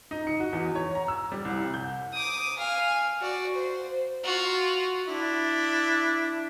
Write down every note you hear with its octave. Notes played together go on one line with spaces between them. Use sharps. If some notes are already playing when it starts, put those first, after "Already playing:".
D#4
C#7
F#4
E2
C#5
A#5
E6
G3
C2
G6
D6 D#6
F5 G#5
F#4 D5
C5
F4 F#4
D4 E4